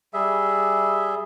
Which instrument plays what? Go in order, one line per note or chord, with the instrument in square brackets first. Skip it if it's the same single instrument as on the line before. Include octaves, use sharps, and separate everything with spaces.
[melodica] G3 G#4 E5